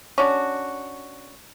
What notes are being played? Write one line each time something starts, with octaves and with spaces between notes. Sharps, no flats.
C#4 D4 F#4